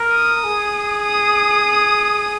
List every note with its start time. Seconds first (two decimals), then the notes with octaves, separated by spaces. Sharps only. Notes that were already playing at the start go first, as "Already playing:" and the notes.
Already playing: A#4
0.14 D#6
0.44 G#4
1.03 D#6